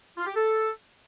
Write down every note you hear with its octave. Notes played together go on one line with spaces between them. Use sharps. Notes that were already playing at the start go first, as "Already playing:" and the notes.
F4
G4
A4